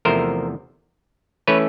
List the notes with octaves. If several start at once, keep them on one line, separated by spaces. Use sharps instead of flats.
E2 C3 F3 A3 A#4 C5
E3 A3 C#4 B4 C#5